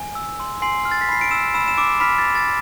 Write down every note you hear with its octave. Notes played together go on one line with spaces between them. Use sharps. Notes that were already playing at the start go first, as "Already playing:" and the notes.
Already playing: G#5
E6
C6
G#5 C6 C7
F6
A6
B6
B5 C7
D7
E6 E7
B5 E6 E7
E7
D6 E6 D7
B5 F6 B6
A6
B5
A6